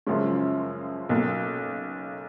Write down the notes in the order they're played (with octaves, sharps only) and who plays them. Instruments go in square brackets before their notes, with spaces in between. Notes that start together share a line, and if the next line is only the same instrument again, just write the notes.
[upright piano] F#2 C#3 F3 G#3 C#4
B1 B2 A#3